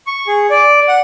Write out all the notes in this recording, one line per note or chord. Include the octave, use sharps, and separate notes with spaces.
C#6
G#4
D5
F#5